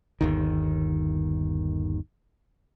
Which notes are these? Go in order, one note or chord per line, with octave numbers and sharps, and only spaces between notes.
G1 D#2 D#3